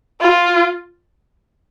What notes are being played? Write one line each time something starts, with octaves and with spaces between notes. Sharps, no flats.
F4